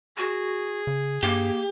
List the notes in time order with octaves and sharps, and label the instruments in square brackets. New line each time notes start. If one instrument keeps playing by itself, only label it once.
[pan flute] F#4 [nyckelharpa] G#4
[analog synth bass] C#3
[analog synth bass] G2 [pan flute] A#3 [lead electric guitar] G4